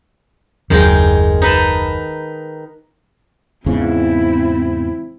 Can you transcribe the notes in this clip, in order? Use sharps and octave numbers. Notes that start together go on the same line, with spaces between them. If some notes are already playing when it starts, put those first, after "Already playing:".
F#1 D#2 D#3 F#3 G#3 G5
D#4 B4 A5
E2 G#2 C#3 C4 E4